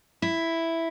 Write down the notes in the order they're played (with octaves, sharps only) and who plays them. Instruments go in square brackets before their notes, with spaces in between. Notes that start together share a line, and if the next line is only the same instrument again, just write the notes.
[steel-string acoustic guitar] E4